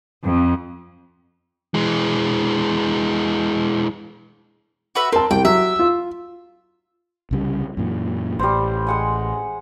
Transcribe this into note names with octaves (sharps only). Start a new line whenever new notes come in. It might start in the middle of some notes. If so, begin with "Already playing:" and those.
F2
E3 G#3
F#4 B4 E5
C4 A#4 A5
C2 G5
F#3 E5
F4
C2 C#3 G3
F#2 A#2 E3
A1 G3 C5
G#3 F#5 G#5